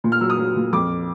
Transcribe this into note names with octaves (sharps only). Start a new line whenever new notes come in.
A#2
F6
F#3 E6
D#6
F#3
A#2
F2 D6